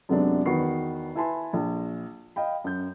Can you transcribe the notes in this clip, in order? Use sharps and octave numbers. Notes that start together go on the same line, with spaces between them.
F#2 C3 F#3 G#3 B3 D4
E2 D#3 F#4 B4 C#6 C7
E4 B4 G#5 A5 B5 C6
A#1
D#5 F5 G5 B5
F#2 G6